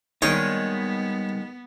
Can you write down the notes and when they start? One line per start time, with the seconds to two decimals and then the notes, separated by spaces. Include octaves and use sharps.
0.22 D#3 G3 G#3 A#3 B3 D#4 C#5 D#6